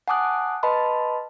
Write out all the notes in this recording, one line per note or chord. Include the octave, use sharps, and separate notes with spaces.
F#5 G#5 A5 D6 D#6 F#6
B4 D#5 A5 B5 C6